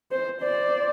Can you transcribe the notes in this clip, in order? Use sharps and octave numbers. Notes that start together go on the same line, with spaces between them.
C5
C5 D5